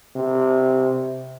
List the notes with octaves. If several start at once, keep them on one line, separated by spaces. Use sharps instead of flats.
C3